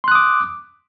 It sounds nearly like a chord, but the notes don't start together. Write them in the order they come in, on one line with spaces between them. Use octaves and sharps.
C6 F#6 D#6 D6